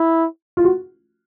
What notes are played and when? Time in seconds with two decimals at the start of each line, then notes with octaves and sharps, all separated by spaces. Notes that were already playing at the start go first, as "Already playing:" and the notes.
Already playing: E4
0.57 F4
0.64 F#4